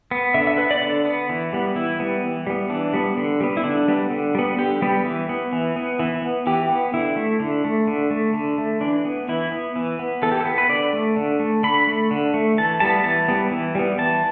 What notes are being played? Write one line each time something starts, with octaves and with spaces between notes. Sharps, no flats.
B3
D3 E5
E5
B3 B4
D5
D3 D5
B3
E3
G3 B3
E3 E4
G3 B3
E3
G3 B3
E3 D4
G3 B3
D3
G3 B3
E4
D3 D4
G3 B3
D3
G3 B3
D3 G4
G3 B3
E3
B3
E3
B3
E3
B3
E3 G4
B3
D3 E4
A3
D3
A3
D3
A3
D3
A3
E3 D4
B3
E3 E4
B3
E3
B3
E3 A4
G4
A4
B3
B4
D3 D5
A3
D3
A3
D3 B5
A3
D3
A3
E3 A5
G3 B3 A5
E3 A5
G3 B3
E3
G3 B3
E3 A5